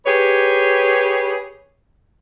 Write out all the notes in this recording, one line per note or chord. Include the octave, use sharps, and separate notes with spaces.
G4 G#4 B4 C#5